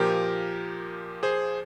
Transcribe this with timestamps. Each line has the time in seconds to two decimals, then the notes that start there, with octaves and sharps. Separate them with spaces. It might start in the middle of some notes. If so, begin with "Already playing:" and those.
Already playing: A#2 F3 G4 A#4
1.23 G#4 C5